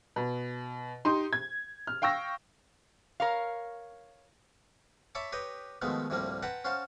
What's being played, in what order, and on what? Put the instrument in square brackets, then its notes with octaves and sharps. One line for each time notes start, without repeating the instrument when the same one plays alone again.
[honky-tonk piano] B2
D#4 G4 C6
G#6
F6
F5 G5 C#6 E6 A#6
[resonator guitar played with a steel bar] A#4 C#5 F5
[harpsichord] C#5 E5 A5 B5 C#6 D6
G4 B4 C#5 D#5 G5
B2 D#3 F3 G#3 A3 B3
D2 A2 C3 F3 G3 A#3
B4 F#5 G5 A5 A#5 C6
C#4 F#4 C5 F5 A5 C6